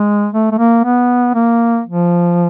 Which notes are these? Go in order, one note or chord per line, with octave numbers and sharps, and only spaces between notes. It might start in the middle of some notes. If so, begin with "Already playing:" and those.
Already playing: G#3
A3
A3
A#3
B3
A#3
F3